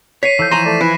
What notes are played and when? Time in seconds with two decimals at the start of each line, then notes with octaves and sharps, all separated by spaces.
0.23 C#5 B6 C7 D#7
0.39 E3 F3 A4 G6
0.51 C#5 G#5 A#5 C6 A#6 D#7 E7
0.65 A3 D5
0.81 E4 B4 G#5